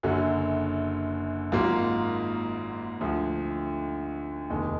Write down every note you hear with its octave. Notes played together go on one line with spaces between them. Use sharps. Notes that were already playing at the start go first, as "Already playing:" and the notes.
F#1 F#2 D3 F#3
G#1 G#2 F#3 A#3 F4
D2 D3 F3
F1 D#2 D#3 G#3